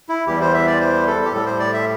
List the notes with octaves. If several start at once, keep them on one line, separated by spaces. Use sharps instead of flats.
E4
E2 E3 G3 G4
C5
E5
D5
C5
A4
G4
A2 G3 A4
C5
D5
E5